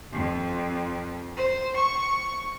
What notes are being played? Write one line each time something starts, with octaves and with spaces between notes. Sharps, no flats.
F2
C5
C#6